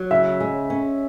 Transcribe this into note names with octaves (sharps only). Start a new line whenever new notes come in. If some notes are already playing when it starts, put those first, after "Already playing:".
Already playing: F#3
C#3 E5
G#3
C#4